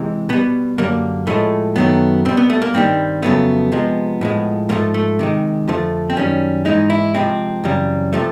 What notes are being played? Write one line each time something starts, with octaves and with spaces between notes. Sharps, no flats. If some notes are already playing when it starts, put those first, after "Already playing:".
Already playing: C3 E3 G#3
B2 G3 B3
F#2 D3 G3 A#3
A2 F3 G#3 A3
F#2 D#3 F#3 A3 B3
B2 G3 C4
B3
A3
A#3
G2 D#3 G3 C4
F2 C#3 F#3 A3 B3
C3 F3 G#3
A2 F3 G#3
G#2 F3 A3 A#3
A3
C3 D#3 G#3
F2 D3 F3 A3
C4
F#2 D#3 G3 C#4
G#2 E3 G#3 D#4
E4
C3 F3 G#3 C4
F#2 C#3 E3 G3
C3 F3 A3